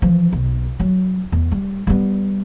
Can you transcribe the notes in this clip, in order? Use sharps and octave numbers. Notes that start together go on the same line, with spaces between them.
E3 F3
B1
F#3
E2
G3
G3 B3